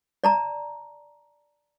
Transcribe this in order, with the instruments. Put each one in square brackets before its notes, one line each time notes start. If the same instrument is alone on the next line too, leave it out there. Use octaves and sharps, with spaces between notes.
[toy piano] D5 A5 A#5